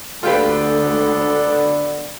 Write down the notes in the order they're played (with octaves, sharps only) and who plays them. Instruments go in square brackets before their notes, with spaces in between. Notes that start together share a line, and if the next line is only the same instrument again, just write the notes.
[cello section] D2 [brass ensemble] D3 B3 D4 [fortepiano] F4 G4 B4 [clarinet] A4